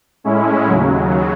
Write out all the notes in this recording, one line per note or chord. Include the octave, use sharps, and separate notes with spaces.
A2 G#3 C#4 E4
D#2 C#3 F#3